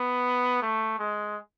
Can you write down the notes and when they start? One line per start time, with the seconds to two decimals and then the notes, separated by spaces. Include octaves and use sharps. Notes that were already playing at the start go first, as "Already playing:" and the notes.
Already playing: B3
0.62 A3
0.99 G#3